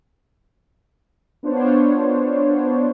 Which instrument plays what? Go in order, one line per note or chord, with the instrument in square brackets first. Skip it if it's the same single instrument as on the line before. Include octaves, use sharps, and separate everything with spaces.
[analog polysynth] B3 D4 F4 C5 C#5